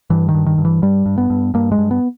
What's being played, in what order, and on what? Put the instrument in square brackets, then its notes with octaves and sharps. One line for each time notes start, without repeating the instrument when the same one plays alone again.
[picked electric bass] G2 E3
D#3
G2
D#3
G2
E3
G2 G3
G2
B3
G2
G2 A#3
G#3
G2
B3